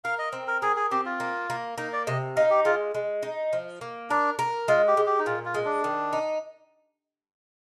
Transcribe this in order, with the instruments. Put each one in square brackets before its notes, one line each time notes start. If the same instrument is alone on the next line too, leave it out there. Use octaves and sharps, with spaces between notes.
[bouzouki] A#4 [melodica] F5
[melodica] D#5
[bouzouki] C4
[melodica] A#4
[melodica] G#4 [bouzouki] A#4
[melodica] G#4
[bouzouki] C4 [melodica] G4
[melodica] F4
[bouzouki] A#3
A#3
[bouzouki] A#3 [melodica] D#4
[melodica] D5
[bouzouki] C3 [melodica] D#5
[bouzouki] D#4 [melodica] F5
[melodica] G4
[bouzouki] G#3 [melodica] F4
[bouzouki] G#3
D#4
F3
A#3
[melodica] D4 [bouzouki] A#4
[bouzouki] A#4
[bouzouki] G#3 [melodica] F4
[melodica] G4
[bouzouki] G#3
[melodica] G4
D#4
[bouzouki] A#2 [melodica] F4
[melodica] F4
[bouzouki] G#3
[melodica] D4
[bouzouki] D#3
D#4